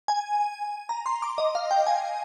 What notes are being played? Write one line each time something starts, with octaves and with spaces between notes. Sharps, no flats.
G#5
A#5
C6
D6
D#5
F5
G5
G#5